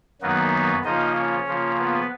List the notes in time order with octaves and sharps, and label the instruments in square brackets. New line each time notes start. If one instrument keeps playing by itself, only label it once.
[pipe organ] F#2 D#3 F#3 A#3 B3 D#4 B4
C#3 F3 A#3 D#4 F4 D#5
C#4 C#5
C#3 F3 A#3 F4
B3 B4